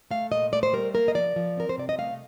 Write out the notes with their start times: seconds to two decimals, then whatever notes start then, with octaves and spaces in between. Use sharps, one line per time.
0.11 A3 F5
0.31 A#2 D#5
0.52 A3 D5
0.63 C5
0.73 G3 A#4
0.94 A#3 A#4
1.08 D#5
1.14 F3 D5
1.36 F3
1.57 C4 A#4
1.69 C5
1.78 C3 D5
1.89 D#5
1.98 A3 F5